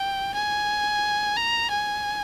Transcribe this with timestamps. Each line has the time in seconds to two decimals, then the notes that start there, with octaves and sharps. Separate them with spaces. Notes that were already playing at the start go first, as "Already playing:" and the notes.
Already playing: G5
0.34 G#5
1.36 A#5
1.71 G#5